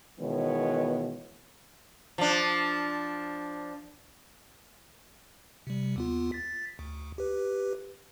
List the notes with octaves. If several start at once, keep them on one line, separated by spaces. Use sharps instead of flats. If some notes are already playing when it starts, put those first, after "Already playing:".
B2 D#3 E3 G#3 B3 C#5
F3 D4
C3 G3
D#2 B3 F4
A6 B6
D2
G4 B4